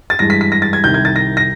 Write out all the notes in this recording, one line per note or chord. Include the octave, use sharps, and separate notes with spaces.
A6
G2 E3 G#3 A#6
B6
B6
A#6
A6
G#6
C2 C3 D#3 G6
G#6
A6
A#6
A#6